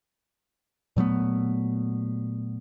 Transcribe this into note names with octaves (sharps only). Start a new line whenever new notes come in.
A#2 F#3 A3 B3